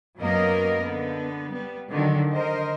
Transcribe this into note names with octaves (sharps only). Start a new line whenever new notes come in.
F#2 F#3 A#3 B3 A#4 D#5
D3 B3
G3 B3
D3 D#3 F#3
A#4 C5 D#5